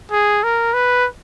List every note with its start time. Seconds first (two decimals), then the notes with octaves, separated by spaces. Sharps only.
0.11 G#4
0.43 A#4
0.74 B4